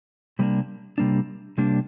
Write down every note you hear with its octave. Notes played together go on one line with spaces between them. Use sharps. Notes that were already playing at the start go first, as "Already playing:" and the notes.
C3 G3 A#3 D4
C3 G3 A#3 D4
C3 G3 A#3 D4